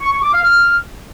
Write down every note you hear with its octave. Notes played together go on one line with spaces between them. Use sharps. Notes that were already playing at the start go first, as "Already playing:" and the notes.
C#6
C#6
D6
F5
F6